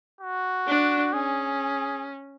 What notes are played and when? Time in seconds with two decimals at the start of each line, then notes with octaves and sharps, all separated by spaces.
0.21 F#4
0.67 D4
1.13 C#4 G#4